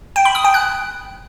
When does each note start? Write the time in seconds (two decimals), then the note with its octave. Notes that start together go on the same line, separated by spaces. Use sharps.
0.16 G5
0.25 B5
0.35 D#6
0.45 G5
0.54 F#6